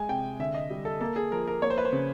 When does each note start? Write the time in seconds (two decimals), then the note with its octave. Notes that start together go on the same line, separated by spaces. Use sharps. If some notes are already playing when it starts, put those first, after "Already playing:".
Already playing: G#3 G#5
0.09 C3 G5
0.39 D3 E5
0.54 D#5
0.71 G3
0.85 A4
1.01 A#3 A4
1.16 G#4
1.32 F3 A#4
1.47 A#4
1.62 A#3 C#5
1.70 C5
1.78 B4
1.85 C5
1.93 C#3